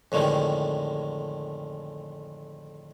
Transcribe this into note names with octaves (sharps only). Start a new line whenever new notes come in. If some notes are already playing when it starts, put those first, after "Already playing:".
F2 A2 D3 D#3 G#3